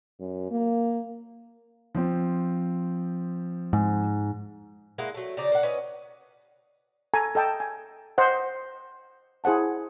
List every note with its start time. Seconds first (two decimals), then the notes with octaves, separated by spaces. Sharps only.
0.19 F#2
0.51 A#3
1.95 F3 C4
3.73 G#2
4.98 G#3 A#3 E4 F#5
5.15 F#3 A3
5.37 C#3 F3 D5 A#5
5.52 A#3 D4 F#5
5.63 C#4 B4 D#5
7.14 A4 G#5 A#5
7.35 A4 D#5 G5 A5
7.60 G#5
8.18 C5 D#5 F#5
9.44 E4 G#4 C5 F#5 A5